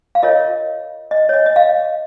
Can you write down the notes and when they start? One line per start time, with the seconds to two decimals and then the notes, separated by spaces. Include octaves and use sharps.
0.15 F5
0.23 F4 A#4 C#5 D#5
1.11 D#5
1.29 C#5
1.34 D#5
1.46 D#5
1.56 F5